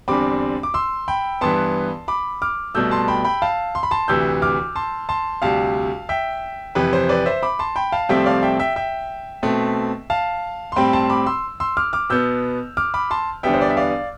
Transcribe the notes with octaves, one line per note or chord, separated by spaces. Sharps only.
E2 D3 G3 C4 B5 D6
D6
C6 E6
G5 B5
G2 E3 B3 A5 C6
B5 D6
D6 F6
C2 B2 A3 E6 G6
A5 C6
G5 B5
G5 B5
F5 A5
C6
B5
A5 C6
D2 C3 E3 E6 G6
D6 F6
A5 C6
A5 C6
D2 C3 G3 F5 A5
E5 G5
F2 C3 E3 B4
C5
B4 D5
C5 E5
B5 D6
A5 C6
G5 B5
F5 A5
C2 C3 F3 A3 C4 E5 G5
D5 F5
E5 G5
E5 G5
E5 G5
B2 A3 C4
F5 A5
C6
A2 G3 C4 G5 B5
A5 C6
B5 D6
C6 E6
C6 E6
D6 F6
D6 F6
B2 B3 E6 G6
D6 F6
B5 D6
A5 C6
E2 D3 G3 B3 E5 G5
C5
D5
E5
D5 F5